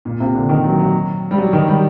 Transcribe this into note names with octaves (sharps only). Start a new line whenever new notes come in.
A#2
C3
D3
D#3
F#3
F#3
G3
F#3
D#3
G3